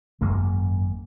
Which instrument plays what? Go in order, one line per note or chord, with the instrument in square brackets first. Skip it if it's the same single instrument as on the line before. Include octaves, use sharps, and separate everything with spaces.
[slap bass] G#1 F#2 G#3 A#3